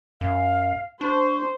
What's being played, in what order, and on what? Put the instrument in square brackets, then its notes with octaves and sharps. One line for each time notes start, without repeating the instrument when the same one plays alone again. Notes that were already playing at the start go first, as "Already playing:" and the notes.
[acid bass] F#2 [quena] F5
[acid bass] D4 [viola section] C5 [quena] C#6